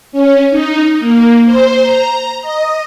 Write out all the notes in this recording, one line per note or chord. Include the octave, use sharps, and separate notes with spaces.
C#4
D#4
A#3
C5
A#5
D#5